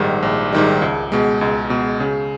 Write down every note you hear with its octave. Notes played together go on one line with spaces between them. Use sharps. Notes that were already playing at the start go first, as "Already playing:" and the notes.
Already playing: A#1 G#2 D#3 G3
A#1
G#2 D#3 G3
C#2
B2 G#3
C#2
B2 G#3
C#3